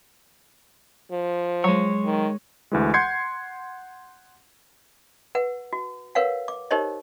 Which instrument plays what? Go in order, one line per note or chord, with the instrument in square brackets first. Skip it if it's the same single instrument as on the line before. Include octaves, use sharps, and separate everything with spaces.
[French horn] F3
[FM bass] F#3 [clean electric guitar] G#3 C#5
[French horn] D#3
[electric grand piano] D2 E3 G#3
F#5 C6 G6 G#6 C7 C#7
[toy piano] B4 F#5
F#4
A#4 B4 C#5 F5 F#5
D6
D#4 G4 A#4 C5 C#5 D#5